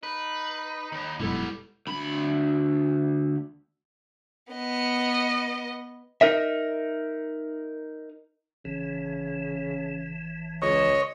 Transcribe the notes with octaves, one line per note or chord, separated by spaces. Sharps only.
D#4 B4
D#2 B5
F1 F#2 B2 G3 G#3 B3 E4 A4
D2 B5
B3 D#5
D#4 A#4 D#5 E5
A1 C#3 E3
C#2 C#5 D#5